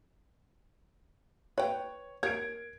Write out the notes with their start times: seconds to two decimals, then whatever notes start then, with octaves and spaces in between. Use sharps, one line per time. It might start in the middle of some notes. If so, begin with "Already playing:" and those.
1.58 B4 C#5 G5
2.23 A#4 C#5 G#6 D7